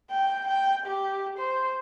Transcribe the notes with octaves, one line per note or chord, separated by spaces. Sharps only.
G5
G5
G4
C5